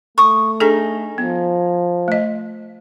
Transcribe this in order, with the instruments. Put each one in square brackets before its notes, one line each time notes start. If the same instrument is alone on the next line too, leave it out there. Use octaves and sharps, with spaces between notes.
[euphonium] A3 [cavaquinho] C#6 D#6
[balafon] D4 G#4 A4 [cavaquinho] D#4 G#5
[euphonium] F3 [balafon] B3
[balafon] A3 D#5